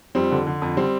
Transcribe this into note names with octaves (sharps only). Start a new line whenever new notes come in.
F2 G3 C4
D3
D3
F2
G3 C4